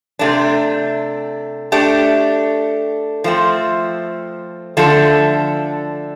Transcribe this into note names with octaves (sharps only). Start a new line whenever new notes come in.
C3 A3 D4
A3 D4 G4
F3 A3 C4
D3 F3 A3 D4 A4